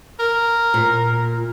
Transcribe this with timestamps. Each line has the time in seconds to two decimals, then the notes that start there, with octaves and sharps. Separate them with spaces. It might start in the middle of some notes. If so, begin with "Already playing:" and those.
0.20 A#4
0.74 A#2